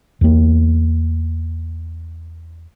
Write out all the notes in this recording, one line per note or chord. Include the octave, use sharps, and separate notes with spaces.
E2 A#3